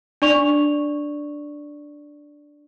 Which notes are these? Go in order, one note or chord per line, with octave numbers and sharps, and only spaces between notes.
D4 D5 C#6 F7